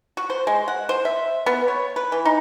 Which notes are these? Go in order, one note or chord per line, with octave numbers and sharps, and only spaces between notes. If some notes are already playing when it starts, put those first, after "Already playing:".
F#4
C5
G#3
F#5
C5
E5
B3
C#5
B4
E3
D#4